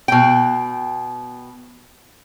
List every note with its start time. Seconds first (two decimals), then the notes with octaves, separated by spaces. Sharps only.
0.08 B2 G5